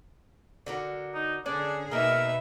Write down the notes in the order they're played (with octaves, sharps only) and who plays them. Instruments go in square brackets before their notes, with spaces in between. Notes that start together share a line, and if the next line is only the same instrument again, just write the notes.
[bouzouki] D3 F#4 A#4
[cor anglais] D#4
[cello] D3 G#4 [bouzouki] C#4 D5 [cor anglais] D4
[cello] B2 [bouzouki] A#3 D#4 [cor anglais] A#4 [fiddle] B4 E5